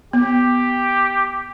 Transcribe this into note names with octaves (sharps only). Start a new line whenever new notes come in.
B3 G4